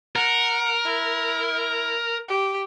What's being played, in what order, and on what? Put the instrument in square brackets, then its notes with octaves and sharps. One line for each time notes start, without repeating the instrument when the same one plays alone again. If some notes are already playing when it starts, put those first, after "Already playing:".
[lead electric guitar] A#4 [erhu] F#5
[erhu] E4
G4